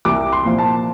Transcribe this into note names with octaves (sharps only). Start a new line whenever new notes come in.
C2 D6
C6
A#2 F3 A#3
A5